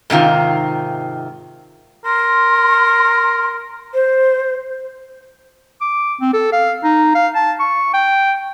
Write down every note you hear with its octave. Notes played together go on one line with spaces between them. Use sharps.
G#2 C3 D#3 F4
A#4 C6
C5
D6
C4
A4
F5
D#4
F5
A5
C#6
G5